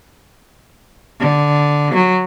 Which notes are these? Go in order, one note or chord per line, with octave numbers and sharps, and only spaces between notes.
D3
F#3